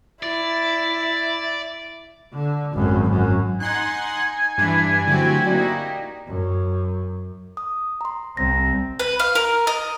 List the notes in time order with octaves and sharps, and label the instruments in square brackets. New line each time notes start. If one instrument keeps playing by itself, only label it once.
[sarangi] E4 [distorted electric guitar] D5
[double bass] D3
G#1 F#2
F#2
[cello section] D#4 [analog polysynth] F#5 C6 F#6 [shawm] G#5
[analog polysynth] G2 D4 [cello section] E3
[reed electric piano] D3 F#3 [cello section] A3 C4 G4 [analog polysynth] E4 F#4
[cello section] A#3 D#4 G4 [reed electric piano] D5
[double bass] F#2
[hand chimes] D#6
A#5 C6
[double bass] C2 C4 [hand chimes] A#6
[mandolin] B4
F5
A#4
D#5